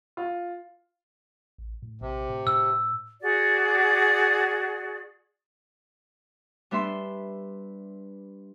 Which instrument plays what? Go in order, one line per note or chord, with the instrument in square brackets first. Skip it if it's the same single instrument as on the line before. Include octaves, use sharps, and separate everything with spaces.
[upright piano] F4
[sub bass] A1
A2
[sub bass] A#1 [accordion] C3
[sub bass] A2
[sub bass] A2 [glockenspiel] E6
[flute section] F#4 G#4 D5
[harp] G3 B3 D4 E5 C6